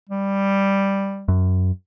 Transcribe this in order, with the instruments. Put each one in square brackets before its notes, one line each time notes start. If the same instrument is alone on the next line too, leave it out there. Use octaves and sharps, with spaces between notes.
[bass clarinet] G3
[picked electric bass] F#2